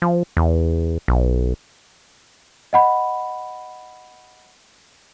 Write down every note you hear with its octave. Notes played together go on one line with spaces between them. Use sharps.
F3
E2
B1
D#5 F#5 B5